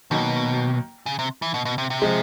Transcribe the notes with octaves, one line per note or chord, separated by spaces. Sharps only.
B2 D#3 F#3 A#3
C#3
C3
E3
B2
B2
C3
C3
F3 G#3